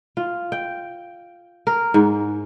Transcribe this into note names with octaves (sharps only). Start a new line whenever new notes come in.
F4
G5
A#4
G#2